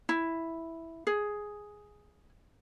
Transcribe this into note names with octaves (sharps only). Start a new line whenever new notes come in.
E4
G#4